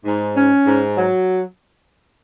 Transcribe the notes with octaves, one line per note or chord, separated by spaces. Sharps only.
G#2
C#4
G#2
F#3